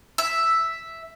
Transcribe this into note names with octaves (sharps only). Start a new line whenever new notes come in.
E5